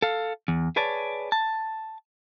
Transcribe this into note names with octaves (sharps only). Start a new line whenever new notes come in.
A4 F5
E2
G#4 B4 C#5 D5 A5
A5